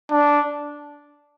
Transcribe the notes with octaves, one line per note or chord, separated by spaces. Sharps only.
D4